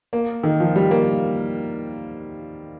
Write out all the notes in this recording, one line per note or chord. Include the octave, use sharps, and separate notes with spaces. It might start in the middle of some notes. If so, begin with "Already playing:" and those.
A#3
D#3
F3
G3
A#3